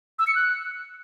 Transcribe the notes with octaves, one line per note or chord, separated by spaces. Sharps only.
E6
C#7
F#6